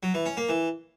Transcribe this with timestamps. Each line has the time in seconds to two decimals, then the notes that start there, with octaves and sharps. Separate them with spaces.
0.03 F#3
0.14 E3
0.26 C#4
0.37 A#3
0.49 E3